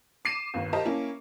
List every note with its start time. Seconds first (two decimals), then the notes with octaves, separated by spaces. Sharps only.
0.25 D6 C7 D#7 E7
0.54 G1 D#2
0.73 G4 A#4 C5 D#5 A5 A#5
0.85 A#3 C#4 E4